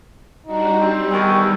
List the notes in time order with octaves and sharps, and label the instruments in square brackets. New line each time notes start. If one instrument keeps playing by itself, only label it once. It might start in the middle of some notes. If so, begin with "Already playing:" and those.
[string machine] G3 D4 F#4 [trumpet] D#4
[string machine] G3 [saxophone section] C4 [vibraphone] G4
[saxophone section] E2 D#3 [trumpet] G5 [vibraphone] C#6 E6